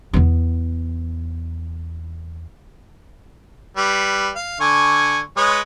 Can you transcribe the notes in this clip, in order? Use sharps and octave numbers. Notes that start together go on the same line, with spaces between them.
E2 B3
G3 B4
F5
D3 G#5 C#6
G#3 B4 C#5